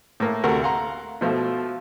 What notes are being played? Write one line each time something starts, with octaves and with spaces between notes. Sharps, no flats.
A2 A#3
D2 C3 A4 A#4 F#5 C#6
F5 F#5 A#5 C6
B2 F3 A3 F4